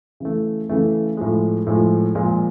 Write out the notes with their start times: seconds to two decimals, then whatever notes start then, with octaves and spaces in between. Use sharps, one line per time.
0.20 C#3 E3 A3
0.69 C#3 E3 A3
1.17 A2 F3 G#3
1.67 A2 F3 G#3
2.15 A#2 F3 G#3